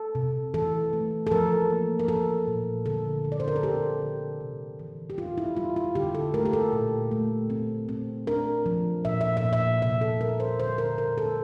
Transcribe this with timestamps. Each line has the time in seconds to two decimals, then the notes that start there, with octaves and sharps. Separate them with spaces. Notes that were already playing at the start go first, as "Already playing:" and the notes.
Already playing: A4
0.15 C3
0.54 E3 A4
0.93 A3
1.27 A4
1.31 F3 A#4
1.70 A#3
1.99 A#4
2.08 F3 A4
2.47 A#2
2.86 D3 A4
3.25 D3
3.32 D5
3.40 C5
3.48 A#4
3.56 A4
3.63 C4 G4
4.02 D3
4.41 C3
4.79 E3
5.10 G4
5.18 G3 F4
5.38 E4
5.57 G3 F4
5.76 F4
5.95 D3 G4
6.15 A4
6.34 A3 A#4
6.45 G4
6.53 A4
6.73 A#2
7.11 A3
7.50 C4
7.89 C4
8.27 D4 A#4
8.66 F3
9.04 A#2 E5
9.21 E5
9.37 E5
9.44 A#2
9.53 E5
9.82 C3 E5
10.01 A4
10.20 G3 A#4
10.40 C5
10.59 D3 C5
10.78 A#4
10.98 D3 A#4
11.18 A4